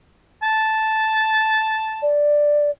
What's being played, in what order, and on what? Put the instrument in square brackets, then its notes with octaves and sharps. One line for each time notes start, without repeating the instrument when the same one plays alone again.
[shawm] A5
[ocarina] D5